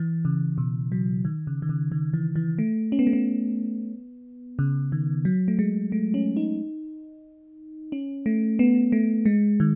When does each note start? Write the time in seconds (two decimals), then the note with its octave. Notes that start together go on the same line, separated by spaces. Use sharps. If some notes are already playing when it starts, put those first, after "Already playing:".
Already playing: E3
0.25 C#3
0.58 B2
0.92 F#3
1.25 D#3
1.47 C#3
1.62 D#3
1.69 C#3
1.92 D#3
2.14 E3
2.36 E3
2.58 A3
2.92 C#4
2.99 B3
3.07 A3
3.13 B3
4.59 C#3
4.92 D#3
5.25 F#3
5.48 A3
5.59 G#3
5.92 A3
6.14 C#4
6.37 D#4
7.92 C#4
8.26 A3
8.59 B3
8.92 A3
9.26 G#3
9.60 D#3